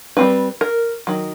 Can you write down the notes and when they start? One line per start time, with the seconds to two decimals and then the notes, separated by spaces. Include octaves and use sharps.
0.17 G3 C4 D#4 B4
0.61 A#4
1.07 D#3 F#3